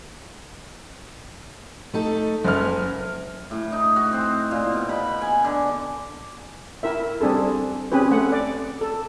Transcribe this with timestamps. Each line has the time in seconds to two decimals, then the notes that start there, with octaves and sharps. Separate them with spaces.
1.94 A3 D#4 A4
2.44 F#1 C#4 F6
3.51 A2
3.72 D#4
3.96 F#4
4.12 C4
4.51 A#2
4.73 B2
4.89 B5
5.21 G#5
5.44 D3
6.83 E4 A#4 E5
7.21 G3 C4 D4 G#4 A4
7.92 C4 C#4 G4 G#4 B4
8.11 A3 F#5
8.32 D5
8.81 A4